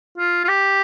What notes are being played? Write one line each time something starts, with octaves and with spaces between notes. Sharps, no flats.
F4
F4
G4